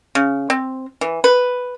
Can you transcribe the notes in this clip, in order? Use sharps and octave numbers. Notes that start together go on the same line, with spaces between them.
C#3
C4
E3
B4